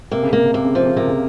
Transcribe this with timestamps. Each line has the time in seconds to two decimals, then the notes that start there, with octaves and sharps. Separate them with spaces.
0.11 C3 A#3
0.23 C#3
0.33 C3 A#3
0.43 C#3
0.54 C3 A#3
0.65 C#3
0.75 C3 F3
0.86 C#3
0.96 C3 A#3
1.07 C#3